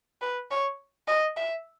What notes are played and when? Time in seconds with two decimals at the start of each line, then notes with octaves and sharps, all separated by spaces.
0.21 B4
0.51 C#5
1.08 D#5
1.37 E5